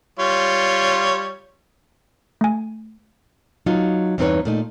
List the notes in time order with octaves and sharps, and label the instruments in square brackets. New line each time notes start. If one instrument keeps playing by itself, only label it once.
[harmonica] G3 F4 C#5
[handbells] A3 G#5
[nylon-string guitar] F#3 D#4 F4
E2 G2 C4 D#4 B4 C#5
A#2 A3 D#4